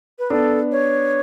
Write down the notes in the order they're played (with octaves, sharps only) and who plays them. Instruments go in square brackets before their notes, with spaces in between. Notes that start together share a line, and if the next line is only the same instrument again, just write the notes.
[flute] B4
[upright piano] B3 D4 [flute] A4
[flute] C#5